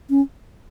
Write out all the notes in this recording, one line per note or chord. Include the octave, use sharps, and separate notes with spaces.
C#4